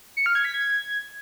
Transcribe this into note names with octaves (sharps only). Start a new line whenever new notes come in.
C#7
F6
G#6
B6
G#6